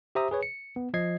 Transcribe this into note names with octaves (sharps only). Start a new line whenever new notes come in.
G4 C5 E5 A#5 D#6
G#4 B4 C#5
C#7
B3
F3 D#5 G#6 C7